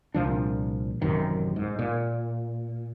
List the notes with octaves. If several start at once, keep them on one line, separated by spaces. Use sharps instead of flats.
C2 A#2 F3 D4
A1 F#2 C3 D#3
G#2
A#2